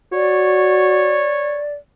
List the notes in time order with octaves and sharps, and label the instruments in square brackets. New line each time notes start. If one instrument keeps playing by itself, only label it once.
[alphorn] F#4 [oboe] C#5 [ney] D5